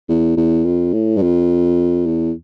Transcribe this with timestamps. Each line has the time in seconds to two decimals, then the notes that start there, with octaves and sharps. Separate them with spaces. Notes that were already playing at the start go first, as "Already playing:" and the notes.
0.09 E2
0.37 E2
0.65 F2
0.93 A2
1.17 G2
1.22 F2
2.06 E2